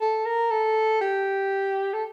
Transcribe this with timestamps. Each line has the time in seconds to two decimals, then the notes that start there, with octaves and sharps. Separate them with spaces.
0.01 A4
0.26 A#4
0.51 A4
1.01 G4
1.94 A4